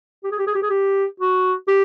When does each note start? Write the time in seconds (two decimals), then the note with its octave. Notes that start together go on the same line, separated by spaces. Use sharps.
0.24 G4
0.31 G#4
0.39 G4
0.47 G#4
0.55 G4
0.62 G#4
0.70 G4
1.20 F#4
1.68 G4